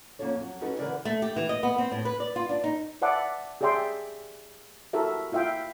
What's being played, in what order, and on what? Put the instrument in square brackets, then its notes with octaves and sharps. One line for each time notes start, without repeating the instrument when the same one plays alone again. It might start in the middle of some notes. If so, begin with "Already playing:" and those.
[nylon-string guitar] F2 A#3 C#4 F4 A4 C#5
F2 F#3
C#4 D#4 F#4 G4 A4 B4
D3 E3 A#4 B4 D5
A3
G4
E3
D#5
B3
C4
A2
B4
D5
F4
D4
D#4
[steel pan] B4 D5 E5 F#5 A5 D6
G4 G#4 D5 E5 G5 C6
E4 F#4 G4 A4 A#4 E5
E4 F4 E5 F5 G5